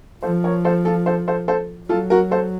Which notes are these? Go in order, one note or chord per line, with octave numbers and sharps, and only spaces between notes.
F3 A4 C5
A#4 C#5
A4 C5
F4 A4
A4 C5
A4 C5
A4 C5
F#3 F4 A4
F#4 A#4
A4 C5